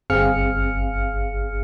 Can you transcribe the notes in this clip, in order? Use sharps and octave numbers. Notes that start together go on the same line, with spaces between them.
G1 C4 G#4 F5 F6 C#7